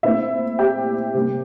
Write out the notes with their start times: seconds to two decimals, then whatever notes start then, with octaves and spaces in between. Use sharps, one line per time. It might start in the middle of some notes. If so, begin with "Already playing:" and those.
0.03 A#2 A3 C4 E4 E5
0.59 G4 G5
1.14 C3 G3 A#3